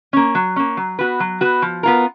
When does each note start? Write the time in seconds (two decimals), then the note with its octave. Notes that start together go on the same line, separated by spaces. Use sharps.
0.13 A#3 C#4
0.35 F#3
0.56 A#3 C#4
0.77 F#3
0.99 B3 F#4 B4
1.20 F#3
1.41 B3 F#4 B4
1.62 F3
1.83 B3 F4 A#4